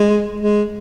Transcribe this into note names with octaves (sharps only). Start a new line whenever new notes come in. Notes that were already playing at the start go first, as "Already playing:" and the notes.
Already playing: G#3
G#3